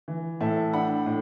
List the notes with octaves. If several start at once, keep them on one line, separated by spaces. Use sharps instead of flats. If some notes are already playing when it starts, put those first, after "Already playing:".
E3
A2 E5 A5
D4 F#5 B5
A2